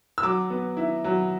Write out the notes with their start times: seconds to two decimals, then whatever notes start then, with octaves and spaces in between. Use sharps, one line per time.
0.18 E6
0.23 F#3 D6
0.50 B3
0.77 E4
1.04 F#3